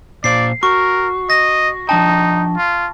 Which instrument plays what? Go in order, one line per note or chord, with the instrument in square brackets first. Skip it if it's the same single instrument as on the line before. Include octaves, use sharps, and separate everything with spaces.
[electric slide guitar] A#2 C5 F5 [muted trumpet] D5 [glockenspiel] C7
[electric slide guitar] F#4 [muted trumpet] A#4 [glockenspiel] C#6
[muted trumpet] D#5 [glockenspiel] A#6
[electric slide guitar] F3 D4 G5 [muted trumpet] D#4 [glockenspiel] A5
[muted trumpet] F4